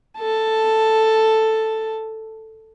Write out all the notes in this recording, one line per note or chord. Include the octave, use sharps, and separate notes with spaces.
A4 A5